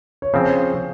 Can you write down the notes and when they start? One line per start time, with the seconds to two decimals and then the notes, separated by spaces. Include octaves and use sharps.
0.22 C#5
0.34 C#3 F3 C4 C5